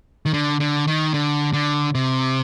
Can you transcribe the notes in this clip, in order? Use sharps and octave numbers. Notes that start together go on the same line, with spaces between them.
D#3
D3
D3
D#3
D3
D3
C3